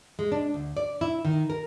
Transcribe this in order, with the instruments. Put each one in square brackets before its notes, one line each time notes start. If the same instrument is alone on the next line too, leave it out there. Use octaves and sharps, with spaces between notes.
[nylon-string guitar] G#3
D4
D2
D5
E4
D#3
A#4